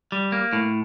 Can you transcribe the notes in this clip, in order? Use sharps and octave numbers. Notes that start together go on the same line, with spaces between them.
G3
A#3
A2